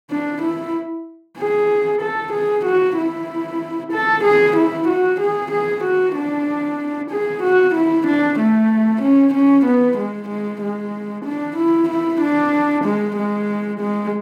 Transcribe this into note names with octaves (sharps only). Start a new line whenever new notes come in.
D4
E4
G#4
A4
G#4
F#4
E4
A4
G#4
E4
F#4
G#4
G#4
F#4
D4
G#4
F#4
E4
D4
A3
C#4
C#4
B3
G#3
G#3
G#3
D4
E4
E4
D4
G#3
G#3
G#3